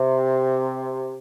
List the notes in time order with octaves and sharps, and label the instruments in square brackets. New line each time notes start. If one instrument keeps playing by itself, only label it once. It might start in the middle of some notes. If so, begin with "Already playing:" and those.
Already playing: [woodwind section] C3